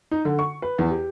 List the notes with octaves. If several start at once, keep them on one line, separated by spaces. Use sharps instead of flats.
D#4
D3
C#6
B4
E2
G4